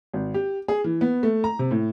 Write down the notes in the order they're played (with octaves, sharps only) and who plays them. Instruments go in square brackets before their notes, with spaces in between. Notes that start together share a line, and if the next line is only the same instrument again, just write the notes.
[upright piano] G#1
G4
G#4
E3
B3
A3
A#5
C3
A2